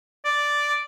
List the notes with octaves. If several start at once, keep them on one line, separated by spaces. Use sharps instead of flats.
D5